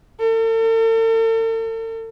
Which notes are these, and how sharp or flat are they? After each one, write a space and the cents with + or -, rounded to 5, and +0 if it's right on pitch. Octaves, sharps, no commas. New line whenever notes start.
A4 +45